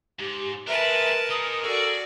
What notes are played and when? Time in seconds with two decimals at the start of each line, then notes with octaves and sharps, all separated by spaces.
0.19 G#2 G4
0.67 G#3 D4 A#4 B4 E5 A5
1.30 G#3 D#4 D#6
1.63 F#4 G#4 A4 D5